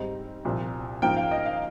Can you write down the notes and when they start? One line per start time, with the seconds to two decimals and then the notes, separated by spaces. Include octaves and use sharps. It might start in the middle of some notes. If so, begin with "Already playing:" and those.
Already playing: G#2 G3 C4 D#4
0.45 C2 A#2 F3
1.02 G#2 F3 A#3 C#4 G5
1.16 F5
1.31 D#5
1.46 F5